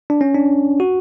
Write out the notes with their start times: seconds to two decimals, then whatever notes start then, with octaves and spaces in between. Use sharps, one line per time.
0.10 D4
0.21 C#4
0.34 D4
0.80 F#4